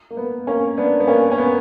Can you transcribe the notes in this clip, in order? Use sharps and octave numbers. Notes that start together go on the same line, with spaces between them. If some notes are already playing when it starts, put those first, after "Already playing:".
A#3
B3
A#3 C#4
B3 D4
B3
A#3 C#4
C#4
B3